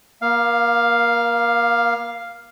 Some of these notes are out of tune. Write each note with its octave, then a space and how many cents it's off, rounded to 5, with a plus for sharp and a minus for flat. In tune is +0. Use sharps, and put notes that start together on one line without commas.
A#3 +30 F5 +0